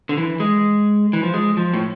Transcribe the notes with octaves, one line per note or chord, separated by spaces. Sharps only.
D3
E3
G#3
E3
F3
G#3
F3
A2